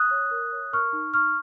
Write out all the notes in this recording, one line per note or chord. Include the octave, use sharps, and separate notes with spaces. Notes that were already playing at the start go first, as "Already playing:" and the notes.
Already playing: D#6 F#6
C#5
A#4
C#5
A#4 C#6 F6
D#4
D#4 C#6 F6